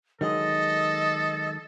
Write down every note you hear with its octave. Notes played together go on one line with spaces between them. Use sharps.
D#3 F#3 G#3 A4 D#5